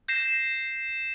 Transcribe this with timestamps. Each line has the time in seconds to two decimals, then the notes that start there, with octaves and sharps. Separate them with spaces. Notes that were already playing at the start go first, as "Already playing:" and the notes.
0.08 G6 A#6 C7 E7